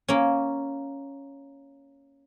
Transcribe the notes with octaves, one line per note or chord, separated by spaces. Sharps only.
A#3 C#4